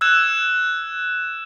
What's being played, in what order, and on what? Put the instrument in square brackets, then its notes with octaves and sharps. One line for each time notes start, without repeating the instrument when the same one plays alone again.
[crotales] E6 F#6 G#6 E7